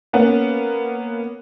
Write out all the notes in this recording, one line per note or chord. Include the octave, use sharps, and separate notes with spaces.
A#3 B3 C#4